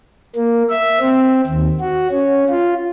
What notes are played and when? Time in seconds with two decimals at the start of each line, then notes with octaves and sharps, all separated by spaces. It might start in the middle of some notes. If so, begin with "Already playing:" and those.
0.36 A#3
0.70 E5
1.00 C4
1.47 D#2
1.80 F#4
2.10 C#4
2.50 F4